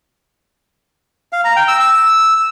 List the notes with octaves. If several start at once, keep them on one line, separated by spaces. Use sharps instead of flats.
F5
A#5
G5
E6
E6